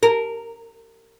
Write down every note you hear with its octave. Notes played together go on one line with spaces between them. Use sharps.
A#4